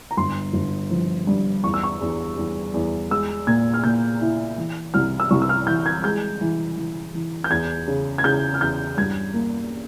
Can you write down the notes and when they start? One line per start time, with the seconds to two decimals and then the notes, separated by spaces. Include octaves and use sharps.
0.11 A#5
0.17 G1 C6
0.54 G1
0.91 F3
1.27 G2
1.64 E2 C#6
1.74 E6
1.83 C#6
2.01 E2
2.37 E2
2.74 E2
3.10 G#3 E6
3.47 A#2 G#6
3.74 F6
3.84 A#2 G6
4.21 E4
4.58 E3
4.94 C2 F6
5.20 E6
5.31 C2 C#6
5.42 E6
5.49 F6
5.67 E3 G6
5.86 G#6
6.04 G#3 G6
6.41 E3
6.77 E3
7.14 E3
7.44 G6
7.50 E2 G#6
7.88 C#3
8.18 G#6
8.24 C#3 G6
8.54 F6
8.61 E2 G6
8.97 G2 G#6
9.33 A#3